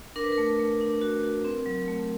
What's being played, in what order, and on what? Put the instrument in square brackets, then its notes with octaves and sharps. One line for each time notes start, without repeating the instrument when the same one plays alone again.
[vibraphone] D4 A#4
B4
A#4
A3
A3
D4
F#4
F#4
C4
F#3
A3